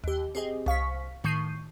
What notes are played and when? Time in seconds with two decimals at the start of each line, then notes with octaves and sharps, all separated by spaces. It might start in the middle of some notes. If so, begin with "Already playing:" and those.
0.04 D#2 G4
0.35 C4 G4 G#4 D#5
0.66 C2 F5 C#6 B6
1.24 A2 D#3 C#6 G6 C7 D#7